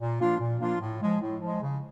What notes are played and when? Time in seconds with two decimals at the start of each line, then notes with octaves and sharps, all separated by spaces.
0.01 A#2
0.20 F3 A#3 D4 F4
0.40 A#2
0.61 F3 A#3 D4 F4
0.81 A2
1.01 F3 G#3
1.21 A2
1.41 F3 G#3
1.62 C#3